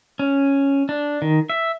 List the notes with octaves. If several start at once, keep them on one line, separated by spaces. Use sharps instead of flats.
C#4
D4
D#3
E5